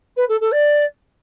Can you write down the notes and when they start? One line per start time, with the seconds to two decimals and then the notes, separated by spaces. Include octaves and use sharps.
0.17 B4
0.29 A4
0.41 A4
0.52 D5